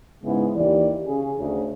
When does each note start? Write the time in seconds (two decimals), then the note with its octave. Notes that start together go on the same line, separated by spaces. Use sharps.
0.24 G#2 C#3 G#3 B3 E4
0.55 D#2 E3 G4 D5
1.06 C#3 G#4
1.38 D2 C#3